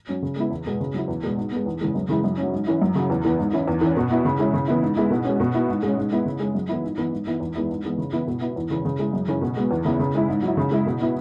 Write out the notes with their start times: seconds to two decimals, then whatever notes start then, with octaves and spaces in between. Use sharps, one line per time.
0.09 F#3 C#4
0.22 C#3
0.36 G#3 B3 E4
0.51 E2
0.65 B2 G#3 B3
0.80 C#3
0.94 F#3 E4
1.08 E2
1.23 B2 G#3 B3
1.37 G#2
1.51 G#3 B3
1.66 E2
1.81 C#3 E3 G#3
1.95 F#2
2.09 C#3 E3 G#3 E4
2.24 F#2
2.38 F#3 C#4
2.52 G#2
2.67 E3 C#4 E4
2.82 F#2
2.95 C#3 F#3
3.10 E2
3.25 E3 B3
3.39 G#2
3.53 E3 C#4 E4
3.68 E2
3.81 E3 C#4
3.97 B2
4.10 B3 E4
4.25 C#3
4.39 G#3 C#4 E4
4.53 C#3
4.68 E3 B3 E4
4.82 G#2
4.97 G#3 B3 E4
5.10 B2
5.25 G#3 C#4
5.40 B2
5.54 B3 E4
5.69 G#2
5.83 G#3 C#4
5.97 G#2
6.11 G#3 B3 E4
6.25 C#3
6.40 G#3 C#4
6.54 F#2
6.69 E3 B3 E4
6.83 G#2
6.98 E3 B3
7.12 G#2
7.27 E3 B3 E4
7.40 E2
7.55 E3 G#3 B3 E4
7.69 G#2
7.85 E3 G#3 B3
7.98 C#3
8.13 E3 B3 E4
8.27 B2
8.41 B3 E4
8.56 E2
8.70 C#3 E3
8.85 C#3
8.99 G#3 E4
9.13 F#2
9.28 C#3 E3 C#4
9.42 B2
9.57 G#3 B3
9.71 E2
9.85 C#3 E3 B3 E4
9.99 C#3
10.15 G#3 E4
10.29 G#2
10.43 F#3 E4
10.57 C#3
10.71 G#3 E4
10.86 B2
11.01 B3 E4